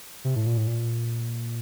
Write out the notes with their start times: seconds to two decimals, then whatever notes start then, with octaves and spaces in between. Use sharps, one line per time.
0.25 C3
0.36 A2
0.46 A#2
0.57 A2
0.67 A#2